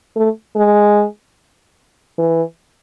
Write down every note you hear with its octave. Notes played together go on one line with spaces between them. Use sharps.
A3
G#3
E3